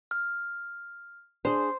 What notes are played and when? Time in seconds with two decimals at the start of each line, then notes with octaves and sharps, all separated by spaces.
0.11 F6
1.45 D4 G#4 C5